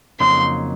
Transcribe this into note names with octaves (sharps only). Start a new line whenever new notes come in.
F2 C#3 F#3 A#3 D#4 C6